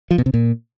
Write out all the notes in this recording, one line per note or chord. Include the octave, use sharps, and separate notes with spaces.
F3
B2
C3
A#2